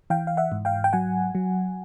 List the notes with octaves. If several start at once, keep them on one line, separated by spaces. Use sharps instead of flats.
E3 F5 G5
F5
E5 F#5
G#2
F5 G5
G5
F#3 F#5 G#5
F#3